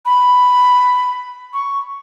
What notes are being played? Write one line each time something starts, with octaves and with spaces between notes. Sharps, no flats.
B5
C#6